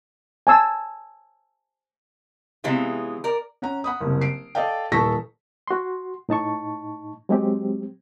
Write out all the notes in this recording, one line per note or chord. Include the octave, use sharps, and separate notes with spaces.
G#5 A5 E6
C3 E3 G#3 B3 C#4 F4
A#4 D5
C#4 F#5 A#5
F#5 B5 D#6
F#1 C2
C7 D7
A4 D5 D#5 F5 G5
D#1 E3 A4 C#6 A#6 B6
F#4 C6
A2 D#4 A5 C#6
F#3 G#3 C4 G4